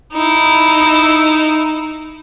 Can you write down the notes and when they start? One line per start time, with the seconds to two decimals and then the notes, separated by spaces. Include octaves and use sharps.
0.13 D#4 E4